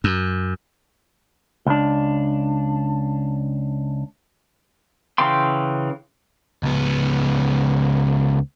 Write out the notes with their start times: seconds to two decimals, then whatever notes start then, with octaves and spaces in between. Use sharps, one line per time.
0.04 F#2
1.67 C#2 D4
5.18 C#3 E3 F5 G5 C6
6.63 C#2 B3